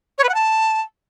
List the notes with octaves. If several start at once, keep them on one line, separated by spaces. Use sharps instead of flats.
C#5
B4
F#5
A5